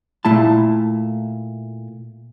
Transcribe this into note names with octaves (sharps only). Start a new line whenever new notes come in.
A#2 A3 E4 A5